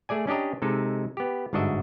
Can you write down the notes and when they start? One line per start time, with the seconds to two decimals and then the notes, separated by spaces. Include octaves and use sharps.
0.09 A3 G#4 D5 G#5
0.27 C#4 D4 G4 D#5 A#5
0.62 C3 G#3 D#4 A4
1.17 B3 G4
1.53 G1 G#2 D4 F#4 D#5 E5